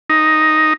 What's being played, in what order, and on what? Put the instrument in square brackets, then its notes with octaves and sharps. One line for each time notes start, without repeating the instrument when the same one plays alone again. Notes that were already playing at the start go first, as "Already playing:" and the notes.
[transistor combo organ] D#4